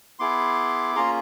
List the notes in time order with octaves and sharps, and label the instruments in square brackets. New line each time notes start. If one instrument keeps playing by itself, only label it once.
[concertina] B3 E4 G#4 C6 D6
A#3 C#4 F4 G#4 A#5 C6